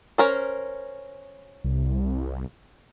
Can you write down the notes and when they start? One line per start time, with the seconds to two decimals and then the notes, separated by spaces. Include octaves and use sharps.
0.18 C#4 A#4 C5
1.64 C2